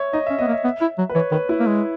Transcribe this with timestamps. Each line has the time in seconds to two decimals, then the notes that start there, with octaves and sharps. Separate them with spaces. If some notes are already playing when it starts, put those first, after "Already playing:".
Already playing: C#5 E5
0.13 D#4 D#5
0.27 C#4 E5
0.39 B3 D#5
0.48 A#3
0.52 E5
0.64 B3
0.81 E4
0.98 F#3
1.09 B4
1.15 E3 C#5
1.31 D#3 B4
1.49 E4
1.60 A#3
1.66 G#3